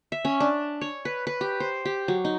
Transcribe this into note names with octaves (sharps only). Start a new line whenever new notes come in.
E5
C#4
D4
C#5
B4
B4
G4
C5
G4
F#3
D#4